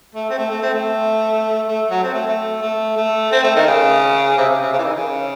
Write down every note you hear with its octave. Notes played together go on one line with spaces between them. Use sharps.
A3
C4
A3
A3
C4
A3
A3
F#3
C4
A3
A3
A3
A3
C4
A3
D#3
C#3
C3
C#3
C3
C#3
E3
D#3
C#3